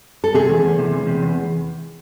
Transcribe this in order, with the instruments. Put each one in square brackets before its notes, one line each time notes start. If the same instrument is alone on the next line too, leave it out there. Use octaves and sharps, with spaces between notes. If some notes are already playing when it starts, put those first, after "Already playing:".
[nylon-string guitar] A4
[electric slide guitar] C3 [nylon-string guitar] G#4
[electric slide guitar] E2
E2
C3
E2
C3
E2